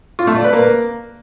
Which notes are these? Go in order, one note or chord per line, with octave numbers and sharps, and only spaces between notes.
F4
A3
D5
B4
A#3